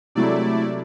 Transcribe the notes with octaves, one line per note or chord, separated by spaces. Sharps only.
C3 F#3 G#3 A3 E4 D5